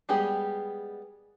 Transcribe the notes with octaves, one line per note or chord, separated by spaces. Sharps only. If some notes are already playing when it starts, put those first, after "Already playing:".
G3 G#3 B3 G4 G#4